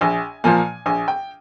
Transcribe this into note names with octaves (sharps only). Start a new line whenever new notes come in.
A#1 G#5
A#2 F3 A#3 G#5
A#1 G#5
G5